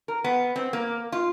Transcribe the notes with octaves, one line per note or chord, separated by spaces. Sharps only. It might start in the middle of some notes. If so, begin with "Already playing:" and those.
A#4
B3
C4
A#3
F4